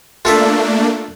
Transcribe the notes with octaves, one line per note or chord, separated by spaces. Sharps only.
A3 A#3 D4 F4 A4 E5